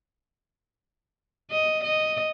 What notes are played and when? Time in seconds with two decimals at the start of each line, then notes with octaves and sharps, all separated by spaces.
1.51 D#5
1.84 D#5